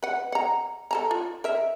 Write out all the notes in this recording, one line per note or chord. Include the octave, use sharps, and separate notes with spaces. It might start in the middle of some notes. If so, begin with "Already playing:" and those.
B4 F#5
F#5 A#5
A4 A5 A#5
F4
A#4 E5